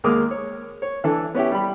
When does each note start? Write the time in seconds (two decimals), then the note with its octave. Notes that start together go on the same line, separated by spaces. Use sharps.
0.04 D#2 G#3 A#3 D6 D#6 F6
0.31 C#5
0.82 C#5
1.04 E3 D4 A4
1.35 B3 C#4 E4 G4
1.52 G3 B5